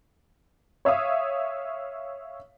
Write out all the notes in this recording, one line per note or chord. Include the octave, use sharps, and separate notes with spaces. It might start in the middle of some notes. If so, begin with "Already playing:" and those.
C#5 E5 F5 D#6